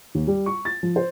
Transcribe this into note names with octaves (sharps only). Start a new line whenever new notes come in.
D#2
G3
C#6
A6
F3
C5